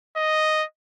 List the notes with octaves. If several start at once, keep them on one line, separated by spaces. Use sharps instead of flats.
D#5